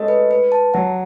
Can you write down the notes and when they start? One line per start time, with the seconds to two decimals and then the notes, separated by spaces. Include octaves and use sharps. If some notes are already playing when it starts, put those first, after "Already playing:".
Already playing: G#3 A3 C#4 D#5
0.08 B4
0.31 B4
0.52 A5
0.74 F#3 F#5